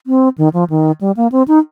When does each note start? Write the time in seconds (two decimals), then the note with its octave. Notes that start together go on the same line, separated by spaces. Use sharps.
0.07 C4
0.38 D#3
0.53 F3
0.70 D#3
1.01 G3
1.17 A#3
1.32 C4
1.48 D#4